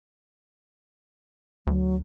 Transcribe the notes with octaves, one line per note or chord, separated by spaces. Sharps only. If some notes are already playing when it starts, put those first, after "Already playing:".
D2 F#3